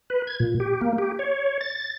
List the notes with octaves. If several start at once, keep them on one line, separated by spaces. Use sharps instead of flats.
B4
G#6
A#2
G4
A#3
G4
C#5
A6